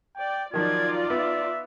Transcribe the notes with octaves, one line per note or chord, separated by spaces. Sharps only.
D5 G5
D#3 F3 F#3 D#4 F4 D5 G#6
B3 E5